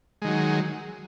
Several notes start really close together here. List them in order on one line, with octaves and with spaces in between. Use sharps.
G#3 D#3 F#3